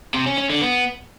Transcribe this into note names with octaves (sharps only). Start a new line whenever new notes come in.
C3
C#4
C#4
D3
B3